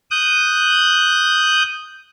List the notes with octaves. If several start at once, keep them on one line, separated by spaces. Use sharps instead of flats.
D#6 F#6 G6